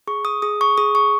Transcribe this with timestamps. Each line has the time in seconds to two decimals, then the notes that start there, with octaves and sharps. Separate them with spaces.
0.07 G#4 C#6
0.25 D#6
0.42 G#4 D#6
0.61 C#6
0.78 G#4 D#6
0.95 C#6